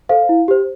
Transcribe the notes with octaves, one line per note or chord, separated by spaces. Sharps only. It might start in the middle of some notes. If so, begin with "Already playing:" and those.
A4 C5 F5
E4
G4 C5